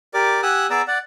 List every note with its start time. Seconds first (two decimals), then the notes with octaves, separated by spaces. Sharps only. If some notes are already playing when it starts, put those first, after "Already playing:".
0.14 G4 A#4 D5 D6
0.43 G4 F#5 G#5 D#6 E6 F#6
0.70 B3 G#4 D5 A#5 D6 E6
0.88 D5 F#5